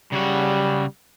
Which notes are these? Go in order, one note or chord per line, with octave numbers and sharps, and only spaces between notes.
C#3 G3 F#4